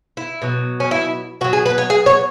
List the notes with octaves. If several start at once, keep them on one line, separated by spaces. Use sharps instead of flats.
E4
B2 F#3
C#4
E4
B2 F#3 F#4
G#4
B4
C#5
G#4
C#5